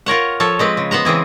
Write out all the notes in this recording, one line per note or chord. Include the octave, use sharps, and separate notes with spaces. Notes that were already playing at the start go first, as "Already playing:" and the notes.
F4 A#4 C#5 F#5
F3 A4 C#5
G#3 C4 B4
C#3
B3 C5 F#5 A#5
C#3 E3 C4 G#4